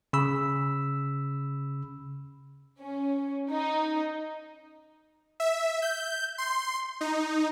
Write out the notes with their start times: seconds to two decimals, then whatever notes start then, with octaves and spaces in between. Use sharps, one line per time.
0.13 C#3 B5 E6
2.81 C#4
3.51 D#4
5.40 E5
5.82 G6
6.38 C6
7.01 D#4